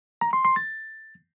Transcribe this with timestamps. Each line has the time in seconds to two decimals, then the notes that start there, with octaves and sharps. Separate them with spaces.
0.21 A#5
0.33 C6
0.45 C6
0.56 A6